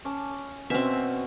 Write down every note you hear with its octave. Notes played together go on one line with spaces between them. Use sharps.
C#4 A5 D6
B2 C4 C#4 E5